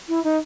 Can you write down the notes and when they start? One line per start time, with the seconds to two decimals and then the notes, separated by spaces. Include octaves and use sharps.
0.08 E4
0.24 D#4